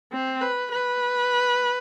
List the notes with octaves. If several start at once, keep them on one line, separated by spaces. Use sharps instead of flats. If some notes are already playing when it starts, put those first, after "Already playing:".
C4
B4
B4